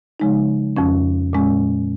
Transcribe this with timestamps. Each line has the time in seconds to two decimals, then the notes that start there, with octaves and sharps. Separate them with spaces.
0.20 C#3 F3 G#3 D#4
0.77 F2 F3 C#4
1.33 A#2 G#3 C#4